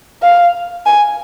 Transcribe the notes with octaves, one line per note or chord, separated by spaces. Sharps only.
F5
G#5